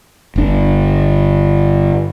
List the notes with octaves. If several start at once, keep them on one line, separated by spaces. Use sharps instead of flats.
G1 D4